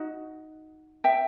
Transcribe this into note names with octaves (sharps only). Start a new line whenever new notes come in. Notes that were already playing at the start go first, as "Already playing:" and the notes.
Already playing: D#4 F#4
E5 G5